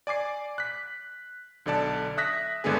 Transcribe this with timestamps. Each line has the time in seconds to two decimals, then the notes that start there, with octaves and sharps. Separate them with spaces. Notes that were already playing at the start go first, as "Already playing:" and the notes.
0.07 D5 G#5 D6 C7
0.58 F#6 B6
1.66 B1 D3 D5 A5
2.17 E5 D#6 F#6 A#6 B6
2.64 G1 D3 G#3 B3 G#4